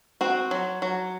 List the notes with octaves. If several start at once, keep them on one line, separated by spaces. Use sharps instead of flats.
C4 F#4
F#3
F#3